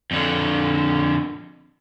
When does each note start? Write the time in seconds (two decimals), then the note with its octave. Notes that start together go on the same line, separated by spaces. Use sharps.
0.11 F2 D3